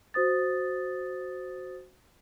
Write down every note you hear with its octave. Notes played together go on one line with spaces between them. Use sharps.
F#4 C5 D#6 A6